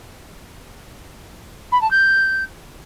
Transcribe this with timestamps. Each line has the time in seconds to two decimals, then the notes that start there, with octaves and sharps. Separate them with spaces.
1.72 B5
1.81 A5
1.91 G6